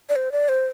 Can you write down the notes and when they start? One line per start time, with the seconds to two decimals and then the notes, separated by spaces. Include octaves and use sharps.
0.09 D5
0.16 C5
0.32 D5
0.49 C5